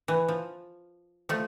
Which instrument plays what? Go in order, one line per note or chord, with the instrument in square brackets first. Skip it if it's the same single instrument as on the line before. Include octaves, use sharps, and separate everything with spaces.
[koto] E3
F3
F3 A3